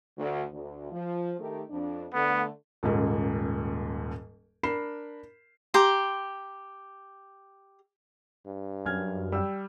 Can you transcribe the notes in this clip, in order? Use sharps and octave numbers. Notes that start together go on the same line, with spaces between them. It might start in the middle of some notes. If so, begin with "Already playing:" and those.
D2
D2
F3
D#3 A3 G4
F2 D4
D3 A3 B3
D#1 D#2 G#2 C#3
D4 A#4 B5 C7 E7
G4 A#5 C6
G2
F#2 G#5 F6 G#6
G3 G5 E6